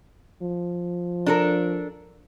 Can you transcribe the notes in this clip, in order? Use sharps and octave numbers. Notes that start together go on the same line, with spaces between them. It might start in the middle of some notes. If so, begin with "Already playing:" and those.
F3
D4 A4 A#4